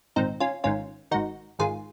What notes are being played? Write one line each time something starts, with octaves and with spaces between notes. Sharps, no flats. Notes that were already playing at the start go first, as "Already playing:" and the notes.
A#1 G#2 D#3 C4 D#4
C#4 F4
G#1 G#2 D#3 C#4 F4
G#1 G#2 D#3 D#4 F#4
G#1 G#2 D#3 F4 G#4